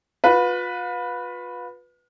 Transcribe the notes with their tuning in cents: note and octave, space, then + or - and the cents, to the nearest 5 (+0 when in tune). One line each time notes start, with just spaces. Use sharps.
F4 +40 B4 -5